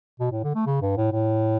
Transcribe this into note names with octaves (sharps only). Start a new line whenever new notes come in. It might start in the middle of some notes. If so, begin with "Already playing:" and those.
B2
A2
D3
A3
C#3
G2
A2
A2